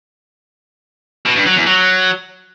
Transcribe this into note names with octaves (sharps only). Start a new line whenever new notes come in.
B2
G2
F#3
E2
F#3